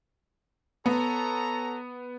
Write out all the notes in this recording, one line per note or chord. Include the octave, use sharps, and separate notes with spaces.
B3 A4 C#5 A#5